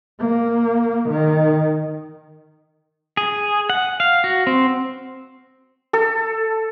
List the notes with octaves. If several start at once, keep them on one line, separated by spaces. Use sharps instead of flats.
A#3
D#3
G#4
F#5
F5
F#4
C4
A4